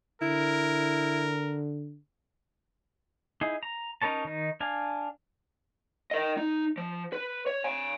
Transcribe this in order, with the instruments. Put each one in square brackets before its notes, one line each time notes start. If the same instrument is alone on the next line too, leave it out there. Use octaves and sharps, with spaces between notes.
[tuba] D3 [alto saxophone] E4 [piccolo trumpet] A#4
[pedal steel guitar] D#4 E4 G#4
A#5
C#4 D#4 A#4 C#5 A5
D#3 D#4
D4 F5 G#5
[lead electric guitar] A#4 D#5
D#4
F3
B4
C#5
F5 G#5